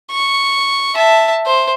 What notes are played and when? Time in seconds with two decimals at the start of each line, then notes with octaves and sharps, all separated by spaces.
0.11 C#6
0.95 E5 A5
1.46 C5